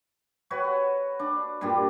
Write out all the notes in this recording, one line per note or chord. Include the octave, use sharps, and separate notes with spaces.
F#4 B4 C#5 F#5
D4
G2 A#2 G3 D4